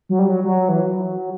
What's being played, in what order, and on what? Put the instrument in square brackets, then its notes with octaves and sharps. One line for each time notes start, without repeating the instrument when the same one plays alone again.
[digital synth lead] F#3
G3
F#3
F#3
E3
F#3